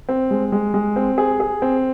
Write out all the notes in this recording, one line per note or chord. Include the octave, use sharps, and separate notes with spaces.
C4
G#3
G#3
G#3
C4
G#4
G#4
C4